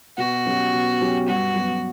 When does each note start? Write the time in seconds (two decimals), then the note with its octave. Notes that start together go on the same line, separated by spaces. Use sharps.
0.18 B2 F#4
0.46 F#3 C#4 G4
0.73 B2
1.01 F#3 C#4 G4
1.28 G2 F#4
1.55 F#3 B3